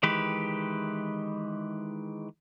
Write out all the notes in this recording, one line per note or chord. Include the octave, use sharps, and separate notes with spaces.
D#3 E3 G#3 G4 B4